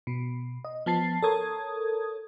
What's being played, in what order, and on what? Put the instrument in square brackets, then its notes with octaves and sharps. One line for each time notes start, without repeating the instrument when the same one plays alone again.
[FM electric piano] B2
D#5
F3 B3 A5 A6 C7
A4 A#4 C#5 D#6 G#6